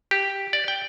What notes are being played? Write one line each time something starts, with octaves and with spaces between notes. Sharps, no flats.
G4
D5
G5